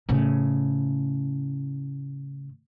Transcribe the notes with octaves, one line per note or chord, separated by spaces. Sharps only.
A2 C#3